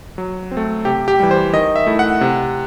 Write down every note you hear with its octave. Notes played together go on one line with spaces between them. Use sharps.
F#3
C4
A3
C3 G4
G4
E3 G3
C5
D#3 D#5
E5
A3 E4
F#5
C3